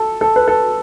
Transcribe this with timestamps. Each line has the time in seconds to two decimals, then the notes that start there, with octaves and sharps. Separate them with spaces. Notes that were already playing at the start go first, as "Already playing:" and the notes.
Already playing: A4
0.21 A4
0.36 B4
0.48 A4